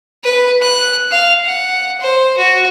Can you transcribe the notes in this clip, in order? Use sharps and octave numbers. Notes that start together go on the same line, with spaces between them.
B4
F#6
F5
F#5
C5
F#4